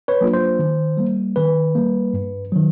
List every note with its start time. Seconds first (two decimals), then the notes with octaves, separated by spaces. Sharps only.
0.08 B4 C#5
0.21 F#3 A#3 D4 F4
0.34 C5
0.59 D#3
0.97 G3 A#3
1.36 D#3 B4
1.75 G3 A#3
2.13 G2
2.52 D#3 F#3